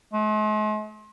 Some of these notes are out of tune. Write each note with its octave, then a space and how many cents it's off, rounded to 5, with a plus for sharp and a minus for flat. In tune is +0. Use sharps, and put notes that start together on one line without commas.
G#3 +45